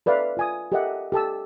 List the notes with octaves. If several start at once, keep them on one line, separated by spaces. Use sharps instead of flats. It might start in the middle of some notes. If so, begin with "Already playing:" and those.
A4 B4 D5 E5 F5
F4 G#5 D#6
G4 A4 A#4 D#5 E5 F#5
G4 A4 A5 E6